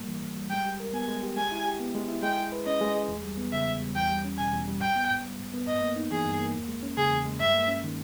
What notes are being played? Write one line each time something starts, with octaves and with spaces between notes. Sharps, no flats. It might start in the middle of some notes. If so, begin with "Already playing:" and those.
Already playing: G#2 G3 A#3
E3
G#2
G3
G#3 G5
G4
A#4
B3 G#5
G#3
G4
G#3 G#5
E4
G4
B3
G#3
E4
G#3 G5
G#4
B4
C#4 D#5
G#3
G#4
E2
G3
B3
C#3 E5
E2
G3
E2 G5
G3
C#4
B2 G#5
E2
G3
G#2 G5
B3
G#2
G3
G#2
B3
G2 D#5
A#3
D#4
E3 G#4
G2
A#3
E2
G#3
C#4
C#3 G#4
E2
G#3
G2 E5
A#3
C#4
D#3